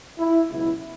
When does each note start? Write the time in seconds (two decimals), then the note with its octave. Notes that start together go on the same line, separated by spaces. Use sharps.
0.19 E4
0.49 C#2 B2 F#3 E4